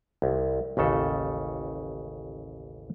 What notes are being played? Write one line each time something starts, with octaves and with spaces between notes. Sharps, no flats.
C2
A1 D#2 C#3 A4